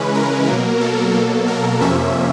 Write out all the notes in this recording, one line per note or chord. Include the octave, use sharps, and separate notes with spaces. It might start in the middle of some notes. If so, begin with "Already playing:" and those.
Already playing: C#3 E3 G#3 C#4 B4
A#4
B2 F#3 A#3
A4
B2 F#3 A#3
A#4
F2 C3 F3 A#3 C#4 E5